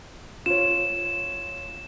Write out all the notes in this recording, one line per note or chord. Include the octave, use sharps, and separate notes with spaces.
F4 C#5 E7